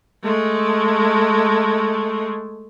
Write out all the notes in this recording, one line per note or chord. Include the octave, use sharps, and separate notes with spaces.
G#3 A3